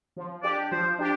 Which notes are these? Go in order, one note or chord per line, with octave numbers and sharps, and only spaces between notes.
F3
D4 G4 D5
F3 C5
D4 G4